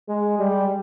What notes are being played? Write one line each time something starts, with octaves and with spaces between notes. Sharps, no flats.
G#3
G3